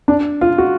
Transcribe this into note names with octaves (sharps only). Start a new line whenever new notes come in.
D4
F4
F#4